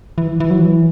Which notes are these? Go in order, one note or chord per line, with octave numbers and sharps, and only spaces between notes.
E3
E3
F#3
E3